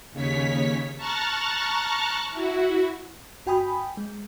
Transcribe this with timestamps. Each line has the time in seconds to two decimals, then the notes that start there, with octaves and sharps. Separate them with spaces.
0.11 D#2 C#3 C#5 B6
0.96 A5 A#5 C#6 F6 F#6 A6
2.30 E4 F#4
3.46 G1 F#4 G5 G#5 B5 D#6
3.97 G#3